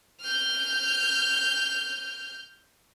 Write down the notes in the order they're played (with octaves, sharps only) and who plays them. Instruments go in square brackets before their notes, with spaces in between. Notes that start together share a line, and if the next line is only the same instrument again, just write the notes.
[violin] F6 G6